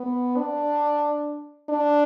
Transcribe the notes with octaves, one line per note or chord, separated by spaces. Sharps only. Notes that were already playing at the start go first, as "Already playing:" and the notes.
Already playing: B3
D4
D4